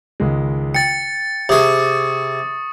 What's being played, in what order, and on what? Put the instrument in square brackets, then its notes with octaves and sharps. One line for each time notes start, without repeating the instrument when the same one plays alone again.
[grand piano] C#2 D#3 G#3
[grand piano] G5 [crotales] A6 C#7
[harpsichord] C3 G#4 [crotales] C#6 D#6